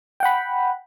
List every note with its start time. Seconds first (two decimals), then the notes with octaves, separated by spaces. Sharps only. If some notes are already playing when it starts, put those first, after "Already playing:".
0.20 G5
0.23 F#5
0.25 B5